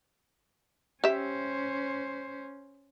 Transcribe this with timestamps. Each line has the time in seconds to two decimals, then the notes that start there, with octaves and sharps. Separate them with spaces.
1.04 C#4 G4 C5 E5